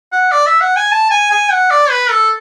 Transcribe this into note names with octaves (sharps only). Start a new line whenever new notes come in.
F#5
D5
E5
F#5
G#5
A5
G#5
G#5
F#5
D5
B4
A4